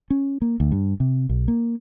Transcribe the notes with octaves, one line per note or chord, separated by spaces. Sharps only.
C#4
A#3
D2
G2
C3
B1
A#3